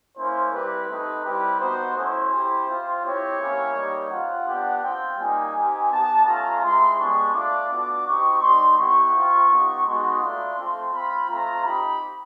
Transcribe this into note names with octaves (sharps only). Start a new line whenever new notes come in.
A#3 C#4 E4 C5
G3 C4 E4 G4 B4
A3 C4 D#4 G4 B4
G3 C4 E4 G4 B4
B3 D#4 F#4 C5
A3 C#4 E4 C5
C4 E4 G4
C4 F4
C4 E4 G4 C#5
A#3 C#4 E4 G4
G3 A#3 D#4 G4
C4 F4 F#5
B3 D4 G4
C4 F4 G5
G3 A#3 D#4 G#5
C4 D#4 G4
B3 D#4 G4 A5
A3 C#4 F4 A#5
G#3 C4 E4 C6
G#3 B3 D4 G4 C#6
A3 D4 F4 D6
B3 D4 F#4
C4 D#4 G4 C#6
G3 C4 D#4 C6
B3 E4 G4 C#6
C4 F4
B3 D#4 G4
G#3 B3 D#4 F#4 C6
A3 D4 F4
A3 C4 F4
C4 F4 B5
A3 C4 F4 A#5
C4 D#4 G4 B5